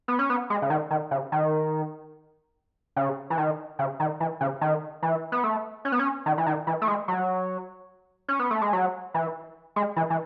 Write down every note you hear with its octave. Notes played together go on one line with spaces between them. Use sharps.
B3
C#4
B3
G#3
C#3
D#3
D#3
C#3
D#3
C#3
E3
D#3
C#3
D#3
E3
C#3
D#3
E3
B3
A3
C#4
B3
C#4
D#3
E3
D#3
E3
A3
G#3
F#3
C#4
B3
A3
G#3
F#3
E3
G#3
E3
E3